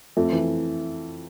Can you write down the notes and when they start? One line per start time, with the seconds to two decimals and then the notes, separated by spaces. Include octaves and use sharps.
0.17 F2 A3
0.32 E3